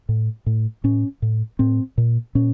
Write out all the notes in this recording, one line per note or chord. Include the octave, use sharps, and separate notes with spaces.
A2
A2
A2 C#4
A2
A2 C4
A#2
A#2 C#4